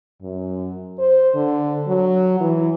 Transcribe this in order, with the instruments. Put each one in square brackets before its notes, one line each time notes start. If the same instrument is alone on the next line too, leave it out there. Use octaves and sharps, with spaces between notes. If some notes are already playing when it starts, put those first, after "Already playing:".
[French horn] F#2
C5
D3
F#3
E3